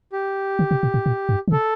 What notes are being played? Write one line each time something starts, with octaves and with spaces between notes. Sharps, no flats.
G4
D3
C3
A#2
A2
A#2
G2
D3
C3 A4